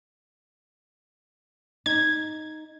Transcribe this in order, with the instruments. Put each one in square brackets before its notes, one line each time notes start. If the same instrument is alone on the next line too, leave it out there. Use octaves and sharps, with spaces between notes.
[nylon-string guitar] D#4 [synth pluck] G#6